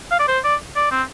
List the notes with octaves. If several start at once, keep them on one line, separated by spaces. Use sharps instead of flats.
F5
D5
C5
D5
D5
C4